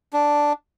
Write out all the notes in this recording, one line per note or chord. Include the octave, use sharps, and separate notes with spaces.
D4